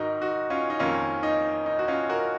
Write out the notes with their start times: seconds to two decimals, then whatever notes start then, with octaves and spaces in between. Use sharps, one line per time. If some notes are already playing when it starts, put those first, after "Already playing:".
Already playing: G#2 D#3 D#4 F#4 A#4
0.22 D#4 F#4
0.50 C#4 F4
0.70 D#4
0.79 F2 D#3 A#3 C#4 F4
1.23 D#4
1.66 D#4
1.79 F#4
1.88 C#4 F4
2.09 F#4 A#4